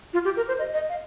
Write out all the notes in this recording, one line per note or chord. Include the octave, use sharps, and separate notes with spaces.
F4
G4
A#4
C5
D#5
D#5
F5